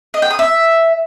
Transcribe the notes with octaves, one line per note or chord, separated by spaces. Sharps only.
D#5
G5
D#6
E5